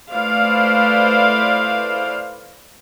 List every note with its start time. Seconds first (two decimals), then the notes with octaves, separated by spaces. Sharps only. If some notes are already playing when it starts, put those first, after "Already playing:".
0.13 A3 E4 B4 C5 D5 F5